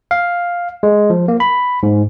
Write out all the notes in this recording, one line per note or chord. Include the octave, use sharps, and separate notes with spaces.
F5
G#3
F3
A#3
B5
G#2